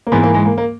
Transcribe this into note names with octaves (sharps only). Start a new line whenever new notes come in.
A#3
G#2 E3 G#3 B3
A#3
G#3
A#3
A#3